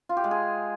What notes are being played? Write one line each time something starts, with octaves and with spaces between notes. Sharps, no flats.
F4
G4
G#3
G#4